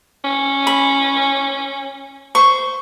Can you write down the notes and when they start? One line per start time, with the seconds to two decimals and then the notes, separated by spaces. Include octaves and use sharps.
0.24 C#4
0.67 B5
2.35 C5 C#6